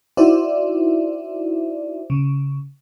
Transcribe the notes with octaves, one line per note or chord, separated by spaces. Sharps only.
D#4 E4 F#4 C5 D5 E5
C#3